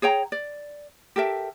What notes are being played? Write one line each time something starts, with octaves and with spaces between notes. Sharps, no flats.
G#4 C#5 G5 A#5
D5
G4 A4 A#4 E5